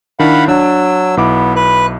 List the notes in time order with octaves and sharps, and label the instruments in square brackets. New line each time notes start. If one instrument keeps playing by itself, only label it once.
[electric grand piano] D#3 D4 E4 [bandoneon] F5 F#5 B5
[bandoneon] F#3 E6 [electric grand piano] D4
[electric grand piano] B1 E4 D6 [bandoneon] B3
[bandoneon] B4 F#6